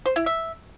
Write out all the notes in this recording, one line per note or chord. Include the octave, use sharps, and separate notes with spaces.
C5
E4
E5